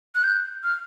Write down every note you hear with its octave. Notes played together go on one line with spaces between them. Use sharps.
F#6
G6
F6